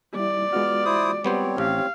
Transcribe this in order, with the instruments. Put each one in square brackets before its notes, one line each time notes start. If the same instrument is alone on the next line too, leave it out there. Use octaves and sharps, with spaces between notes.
[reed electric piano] G3 E4 [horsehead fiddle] D5
[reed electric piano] G#3 F4 F#4 [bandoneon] B3 F6
[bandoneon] E4 C5 D#6
[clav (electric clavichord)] G3 B3 C5 [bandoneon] C4 C#5
[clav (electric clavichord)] A1 [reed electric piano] G4 [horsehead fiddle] F5